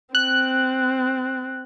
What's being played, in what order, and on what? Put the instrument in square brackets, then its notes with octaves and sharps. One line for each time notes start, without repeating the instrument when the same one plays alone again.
[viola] C4 [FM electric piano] F#6